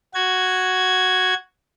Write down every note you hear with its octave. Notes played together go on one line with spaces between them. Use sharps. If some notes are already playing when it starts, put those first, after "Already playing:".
F#4 G#6